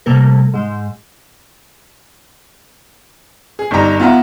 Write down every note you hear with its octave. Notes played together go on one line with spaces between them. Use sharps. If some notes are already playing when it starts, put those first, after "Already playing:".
C3 G3 A3 A#3 A4 A#4
G#2 G#3
G#4
G1 G2 G3 D#4 G4 A#5
B3 F4 E5 F#5 A#5